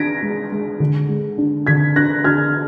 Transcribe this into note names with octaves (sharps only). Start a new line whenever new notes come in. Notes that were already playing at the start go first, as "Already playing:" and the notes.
Already playing: D4 G#6 A#6 B6 D7
G#3
G#3
D3
G#3
D4
D3 G#6 B6
D4 F#6 A#6
D4 F6 G#6